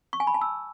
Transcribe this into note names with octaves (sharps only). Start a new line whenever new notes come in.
C#6
G#5
B5
A5
E6